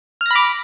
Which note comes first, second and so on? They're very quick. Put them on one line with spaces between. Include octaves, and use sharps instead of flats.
F6 A#6 B5 D6